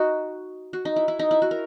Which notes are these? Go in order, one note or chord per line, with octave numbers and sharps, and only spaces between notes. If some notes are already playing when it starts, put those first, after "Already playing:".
Already playing: D#4 F#4
F#4
D#4
E4
E4
D#4
E4
F#4
A#4